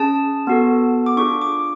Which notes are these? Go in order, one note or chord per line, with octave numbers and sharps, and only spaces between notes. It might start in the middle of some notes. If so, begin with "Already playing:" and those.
Already playing: C#4 G#4 A5
B3 F#4 A4
D6
D4 F4 G#4 C#6
D6